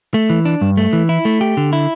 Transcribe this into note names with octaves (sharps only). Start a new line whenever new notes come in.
A3
E3
D4
G2
A3
E3
E4
A3
G4
D3
E4